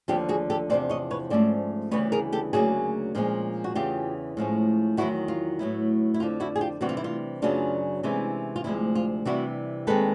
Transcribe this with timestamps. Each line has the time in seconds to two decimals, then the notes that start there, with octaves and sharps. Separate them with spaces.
0.08 D#2 D3 F3 F4 G4
0.29 F#4 G#4
0.50 G4 A4
0.70 E2 C3 F3 C5 D5
0.90 C#5 D#5
1.11 B4 C#5
1.30 G#2 F3 A3 C#4 C5 D5
1.91 D2 C#3 E3 G3 B3 B4 C#5
2.12 G#4 A#4
2.32 G4 A4
2.53 D2 C#3 F#3 A#3 F#4 G#4
3.15 A#2 F3 G#3 C#4
3.64 F#4
3.75 E2 C#3 E3 F4 G4
4.37 A2 F3 G#3 C#4
4.97 E2 C3 D#3 F#3 E4 F#4
5.28 F4
5.59 A2 F#3 B3 E4
6.14 E4
6.20 F2 D3 F3 F4
6.40 E4 F#4
6.56 G#4
6.61 F4 G4
6.81 C3 E3 G3 C4 F#4
6.89 F4
6.97 E4
7.04 F4
7.42 F#2 C#3 F#3 B3 D4 F4
8.03 C3 E3 G#3 C#4 E4
8.56 F4
8.64 D2 C3 F3 G#3 E4
8.95 F4
9.25 C3 E3 G3 E4 F#4
9.87 D#2 D#3 G#3 C4 A4 B4